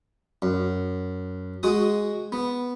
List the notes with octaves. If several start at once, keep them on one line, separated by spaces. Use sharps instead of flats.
F#2
G#3 F#4 D#6
B3